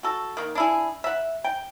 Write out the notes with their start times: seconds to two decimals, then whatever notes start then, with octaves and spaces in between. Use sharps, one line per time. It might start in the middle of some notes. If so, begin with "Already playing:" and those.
0.03 F#4 A4
0.37 D#3 A#3
0.55 D4 E4 G#4
1.04 E5 F#5
1.44 G5